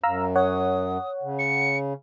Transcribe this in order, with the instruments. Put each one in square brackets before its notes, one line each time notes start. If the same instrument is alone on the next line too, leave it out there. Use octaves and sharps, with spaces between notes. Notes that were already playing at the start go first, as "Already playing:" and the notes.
[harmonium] F#2 [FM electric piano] F5 A#5 E6
[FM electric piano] C#5 F#5 [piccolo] D#6
[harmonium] C#3
[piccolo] C#7